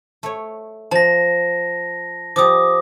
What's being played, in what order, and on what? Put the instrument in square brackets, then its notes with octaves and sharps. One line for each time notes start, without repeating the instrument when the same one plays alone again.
[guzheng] A3 C#5
[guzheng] F3 [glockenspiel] A5 A#6
[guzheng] F3 G3 [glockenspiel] D6 D#6